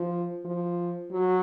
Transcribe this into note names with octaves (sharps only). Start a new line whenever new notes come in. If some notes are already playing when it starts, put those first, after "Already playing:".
Already playing: F3
F3
F#3